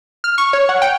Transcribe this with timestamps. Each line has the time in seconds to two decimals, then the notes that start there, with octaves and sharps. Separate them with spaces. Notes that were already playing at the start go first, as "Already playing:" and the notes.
0.24 F6
0.38 C#6
0.53 C#5
0.69 F#5
0.82 G5